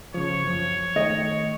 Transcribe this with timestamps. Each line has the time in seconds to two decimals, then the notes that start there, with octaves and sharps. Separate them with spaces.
0.14 C#3 F3 C#5
0.44 F#2 F3
0.96 D#3 A3 D#5 G5